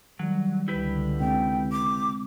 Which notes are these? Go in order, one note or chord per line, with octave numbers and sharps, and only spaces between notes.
D#3 F#3 G3
C#2 D3 E4 G4 B4
C3 G#3 C4 G5
D6